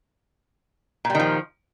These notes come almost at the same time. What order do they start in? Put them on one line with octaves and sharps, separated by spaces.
A#2 G3 D#3 F3